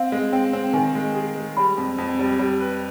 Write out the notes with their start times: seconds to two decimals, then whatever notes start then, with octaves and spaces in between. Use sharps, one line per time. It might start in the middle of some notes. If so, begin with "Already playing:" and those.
Already playing: C4 F5
0.12 G#3
0.32 C4 G5
0.53 C4
0.73 D#3 G#5
0.95 G#3
1.15 G#4
1.36 G#3
1.57 G3 B5
1.78 F2
1.98 F2
2.19 G3
2.39 G3
2.60 B4